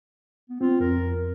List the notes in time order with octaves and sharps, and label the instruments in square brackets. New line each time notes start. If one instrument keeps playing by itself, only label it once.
[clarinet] B3
[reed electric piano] C4 [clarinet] F4
[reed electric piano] F2 [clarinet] A#4